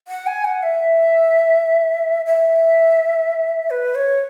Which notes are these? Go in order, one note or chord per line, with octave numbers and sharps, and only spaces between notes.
F#5
G#5
F#5
E5
E5
B4
C#5